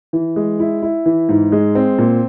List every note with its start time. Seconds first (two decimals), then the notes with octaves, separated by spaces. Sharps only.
0.13 E3
0.36 G#3
0.59 E4
0.82 E4
1.06 E3
1.29 G#2
1.52 G#3
1.75 C4
1.98 A#2